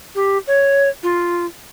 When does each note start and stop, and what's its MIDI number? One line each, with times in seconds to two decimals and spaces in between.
0.15 0.38 67
0.47 0.88 73
1.03 1.45 65